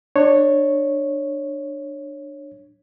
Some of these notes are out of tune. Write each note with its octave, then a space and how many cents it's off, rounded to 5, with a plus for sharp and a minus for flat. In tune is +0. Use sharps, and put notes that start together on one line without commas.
D4 +20 C#5 -10